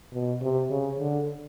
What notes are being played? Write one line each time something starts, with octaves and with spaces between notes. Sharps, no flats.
B2
C3
C#3
D3